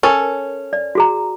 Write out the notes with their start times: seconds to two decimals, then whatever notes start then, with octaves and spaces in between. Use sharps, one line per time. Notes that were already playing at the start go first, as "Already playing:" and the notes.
0.03 C#4 A4 A#4
0.73 D5
0.95 F#4 G#4 A#5